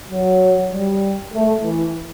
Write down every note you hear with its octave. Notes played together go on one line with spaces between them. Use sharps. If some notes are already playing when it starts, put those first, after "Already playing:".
F#3
G3
A3
E3